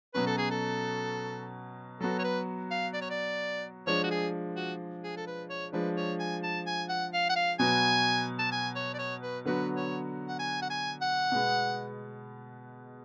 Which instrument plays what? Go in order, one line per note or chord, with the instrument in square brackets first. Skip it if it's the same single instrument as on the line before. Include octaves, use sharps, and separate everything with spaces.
[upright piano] B2 F#3 C#4 [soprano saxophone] B4
[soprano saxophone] A4
G#4
A4
[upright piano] F#3 B3 F#4 [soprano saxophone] A4
[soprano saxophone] C#5
B4
F5
D5
C#5
D5
[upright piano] F3 G#3 D4 [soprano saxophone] C#5
[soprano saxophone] F#4
G#4
F#4
G#4
A4
B4
C#5
[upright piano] F3 G#3 D4 [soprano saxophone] B4
[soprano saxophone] C#5
G#5
A5
G#5
F#5
F5
F#5
F5
[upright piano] B2 F#3 B3 F#4 [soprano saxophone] G#5
[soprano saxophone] A5
G#5
C#5
D5
C#5
B4
[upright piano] D3 F#3 B3 F#4 [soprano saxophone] B4
[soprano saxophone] C#5
F#5
G#5
F#5
G#5
F#5
[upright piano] B2 G#3 B3